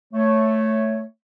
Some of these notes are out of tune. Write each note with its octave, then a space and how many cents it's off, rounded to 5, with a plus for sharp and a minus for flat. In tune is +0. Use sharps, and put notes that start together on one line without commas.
A3 +0 C#5 +0